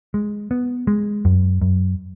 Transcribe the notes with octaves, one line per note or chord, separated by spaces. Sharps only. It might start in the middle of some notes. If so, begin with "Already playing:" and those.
G#3
B3
G#3
F#2
F#2